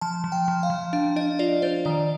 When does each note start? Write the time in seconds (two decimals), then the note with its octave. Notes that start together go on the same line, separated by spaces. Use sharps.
0.01 F3 A5
0.24 F3
0.32 G5
0.48 F3
0.63 F5
0.70 F3
0.93 D4 F5
1.16 D4 D#5
1.39 F4 D5
1.62 D4 C5
1.85 D#3 D5